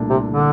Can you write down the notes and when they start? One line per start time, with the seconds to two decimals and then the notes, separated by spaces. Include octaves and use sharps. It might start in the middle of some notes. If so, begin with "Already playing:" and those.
Already playing: C2 A#2 A3 D4
0.10 C3
0.31 D3